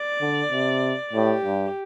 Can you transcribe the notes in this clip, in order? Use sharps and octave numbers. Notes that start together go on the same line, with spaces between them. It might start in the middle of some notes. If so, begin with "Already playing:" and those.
Already playing: D5
D3
C3
A2 G4
G2